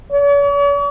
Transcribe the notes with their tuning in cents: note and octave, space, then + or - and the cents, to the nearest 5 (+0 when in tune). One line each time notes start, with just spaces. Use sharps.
C#5 +45